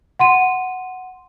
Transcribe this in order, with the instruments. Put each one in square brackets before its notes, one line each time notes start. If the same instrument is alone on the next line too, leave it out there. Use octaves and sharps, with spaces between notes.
[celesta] F#5 C6 D#7